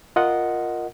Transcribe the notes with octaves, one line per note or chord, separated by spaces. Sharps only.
F4 A#4 D#5 F#5